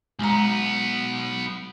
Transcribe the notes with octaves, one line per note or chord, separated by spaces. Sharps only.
B1 G#3 B3 A#5